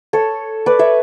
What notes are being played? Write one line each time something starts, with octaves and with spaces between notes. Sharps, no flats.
A4 C#5
B4 D5
C#5 E5